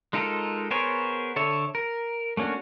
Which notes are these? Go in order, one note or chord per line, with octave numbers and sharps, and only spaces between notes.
G#3 D#4 F4 A4 A#4
B3 G#4 A#4 C5 C#5
D3 A4 C#5 E5
A#4
A3 A#3 C#4 D4 F#4